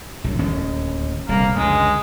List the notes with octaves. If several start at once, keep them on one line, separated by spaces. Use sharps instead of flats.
A#1 F#2
D1 D#2 C#4
D#1 C2 A#3
C#2 F#2 D3 G#3